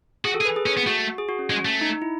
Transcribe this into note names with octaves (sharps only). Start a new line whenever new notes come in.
F#4 G#4
A4
G#4
B4
G#4
C#4
B3
A3 F#4
G#4
F#4
C#4
G#3 C#4
A3
D#4
D#4
E4